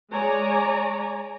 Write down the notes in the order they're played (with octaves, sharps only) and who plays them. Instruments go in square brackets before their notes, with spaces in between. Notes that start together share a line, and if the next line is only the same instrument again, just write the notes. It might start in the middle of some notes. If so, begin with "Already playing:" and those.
[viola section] G#3 C#5 D5 G#5 A#5